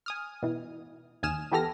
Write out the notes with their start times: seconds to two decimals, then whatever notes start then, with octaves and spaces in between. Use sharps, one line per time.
0.06 G#5 D#6 F6
0.43 B2 E3
1.23 D#2 G#5 D#6 F6 E7
1.51 E3 B3 G4 A4 F6 A#6